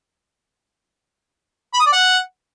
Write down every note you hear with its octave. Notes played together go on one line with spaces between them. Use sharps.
B5
D#6
D5
F#5